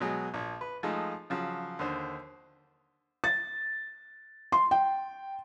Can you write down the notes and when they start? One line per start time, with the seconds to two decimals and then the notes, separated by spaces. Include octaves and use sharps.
0.01 B2 F#3 G#3
0.34 A#1
0.61 B4
0.83 F3 G#3 A3 D#4
1.30 C#3 F3 F#3
1.79 D#2 D3 C5
3.24 A6
4.52 C6
4.71 G5